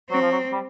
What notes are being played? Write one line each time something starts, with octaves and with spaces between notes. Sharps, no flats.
F#3 C4
F3
F#3
G3